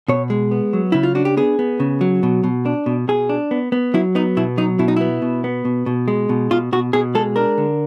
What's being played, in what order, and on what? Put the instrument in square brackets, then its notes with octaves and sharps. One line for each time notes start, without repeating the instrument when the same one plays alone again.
[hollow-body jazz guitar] B2 C#5
G#3
B3
F#3
C#3 E4
F4
D4 F#4
G4
B3 G#4
B3
C#3
F#3
B2
B2
D4
B2
B2 G#4
D4
B3
B3
F#3 E4
B3 D#4
B2 E4
F#3 D#4
B2 E4
D#4
B3 E4
B2
B3
B2
B2
G#3
B2
B2 F4
B2 F#4
B2 G#4
G#3 A4
D4 A#4
D3